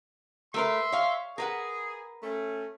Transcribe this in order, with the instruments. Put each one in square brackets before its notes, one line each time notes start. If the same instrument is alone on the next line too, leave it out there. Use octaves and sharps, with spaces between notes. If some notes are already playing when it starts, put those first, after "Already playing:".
[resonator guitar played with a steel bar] A3 A#4 B4 [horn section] E5 C6
[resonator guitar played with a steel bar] C#5 F5
[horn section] G#4 [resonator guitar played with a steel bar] A#4 B4 F#5
[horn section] A3 C#4